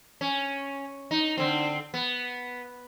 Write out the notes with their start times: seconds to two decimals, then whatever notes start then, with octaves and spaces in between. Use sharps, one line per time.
0.21 C#4
1.11 D#4
1.37 D3 C4
1.94 B3